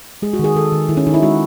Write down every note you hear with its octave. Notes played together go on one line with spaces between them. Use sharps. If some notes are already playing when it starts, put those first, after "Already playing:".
G#3 G#4
F#4
D#3 G#4
D#3 A4
D#3
D#3 E4
C#4
D#3 D#4
E4
G#3 F#4